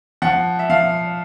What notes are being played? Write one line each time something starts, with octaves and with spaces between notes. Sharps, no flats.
F3 F#5
E5
F3 F5